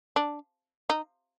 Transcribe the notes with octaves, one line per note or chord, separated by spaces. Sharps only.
D4
D#4